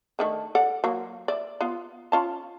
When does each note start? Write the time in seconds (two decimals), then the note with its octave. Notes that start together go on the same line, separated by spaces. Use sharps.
0.19 D3 D#3 A3
0.55 A4 D5 F#5
0.84 F#3 A#3
1.28 D5 E5
1.61 B3 F4
2.12 C#4 F4 A5